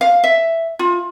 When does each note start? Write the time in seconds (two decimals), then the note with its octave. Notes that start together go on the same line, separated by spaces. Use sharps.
0.01 F5
0.24 E5
0.79 F4